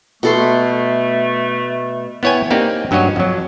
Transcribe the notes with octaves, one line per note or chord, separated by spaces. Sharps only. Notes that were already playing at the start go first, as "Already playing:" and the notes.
B2 A3 A4 C6
B3 E4 C#5 G5 G#5
A#3 C4 D#4 G4 D5
G2 F#3 C#4 F#4 C#5 D#5
F2 F#3